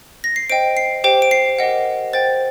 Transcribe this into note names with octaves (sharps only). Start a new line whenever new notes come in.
A#6
C7
C5 D#5 G5 D7
C7
G4 C5 G5 D7
D7
C7
G4 A#4 D#5 F#5
C5 G5 A6